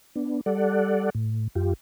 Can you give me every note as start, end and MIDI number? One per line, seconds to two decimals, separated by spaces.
0.15 0.41 59
0.15 0.41 62
0.46 1.10 55
0.46 1.10 69
0.46 1.10 74
0.46 1.10 78
1.15 1.47 45
1.55 1.73 42
1.55 1.73 65
1.55 1.73 67